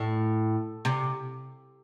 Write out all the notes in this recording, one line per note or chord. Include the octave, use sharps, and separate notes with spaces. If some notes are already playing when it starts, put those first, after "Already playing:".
Already playing: A2
C3